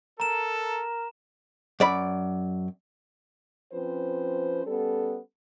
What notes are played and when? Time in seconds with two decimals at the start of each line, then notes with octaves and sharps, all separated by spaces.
0.20 A4 A#4 A#5 E7
1.80 F#2 D5 B5
3.73 F3 C4 C#4 B4 C5
4.66 G3 B3 C#4 A4